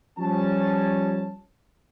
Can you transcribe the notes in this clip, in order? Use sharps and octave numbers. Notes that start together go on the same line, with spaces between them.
F3 G3 C#4 A5